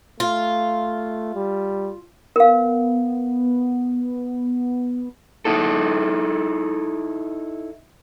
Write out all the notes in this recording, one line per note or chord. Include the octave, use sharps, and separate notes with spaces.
A3 F4
G3
B3 A#4 F5
D#4 E4 A4